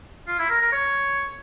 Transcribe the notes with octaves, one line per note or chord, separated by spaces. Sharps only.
F4
E4
A#4
A#4
C#5